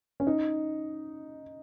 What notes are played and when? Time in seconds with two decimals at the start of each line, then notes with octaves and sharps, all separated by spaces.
0.20 C#4
0.27 D#4